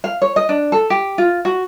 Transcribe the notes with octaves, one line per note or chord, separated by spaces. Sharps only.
F5
C#5
D#5
D4
A4
G4
F4
F#4